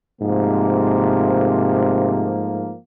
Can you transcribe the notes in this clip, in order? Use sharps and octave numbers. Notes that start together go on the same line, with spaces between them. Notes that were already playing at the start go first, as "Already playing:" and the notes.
G#2 C3 F3 A3 A#3